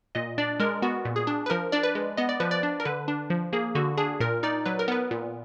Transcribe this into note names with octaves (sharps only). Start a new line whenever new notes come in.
A#2 D#5
D4 D5
G#3 A#4
B3 F#4
A#2
G#4
D4
B4
F3 A#4
D4 D5
B4
G#3
B3 D#5
D5
F3 B4
D5
D4
A#4
D3 B4
D4
F3
A#3 G#4
D3 F#4
D4 G#4
A#2 A#4
D#4 D5
F#3 B4
A#4
B3 B4
A#2